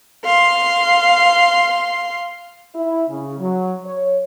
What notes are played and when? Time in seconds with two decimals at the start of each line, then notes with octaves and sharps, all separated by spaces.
0.25 F5 C6
2.75 E4
3.08 C#3
3.39 F#3
3.85 C#5